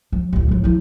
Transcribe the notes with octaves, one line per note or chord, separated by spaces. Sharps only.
F3
A1 D2
A2 F3
F3 E4